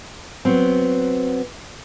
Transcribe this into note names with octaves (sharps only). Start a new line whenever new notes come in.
F#3 B3 C4